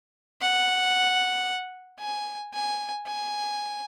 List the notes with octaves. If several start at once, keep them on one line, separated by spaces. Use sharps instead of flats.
F#5
G#5
G#5
G#5